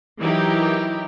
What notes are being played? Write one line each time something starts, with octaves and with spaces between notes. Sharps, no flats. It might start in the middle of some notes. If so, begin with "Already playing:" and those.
E3 F#3 D#4 E4 G4 A#4